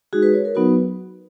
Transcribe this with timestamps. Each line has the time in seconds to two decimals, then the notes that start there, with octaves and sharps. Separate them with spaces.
0.13 G#3 D#4 F#4 G#4
0.23 B4
0.34 C#5
0.45 A#4
0.55 F#3 B3 D#4 F#4 B4